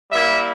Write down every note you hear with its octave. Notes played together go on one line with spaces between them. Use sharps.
G3 A#3 E4 E5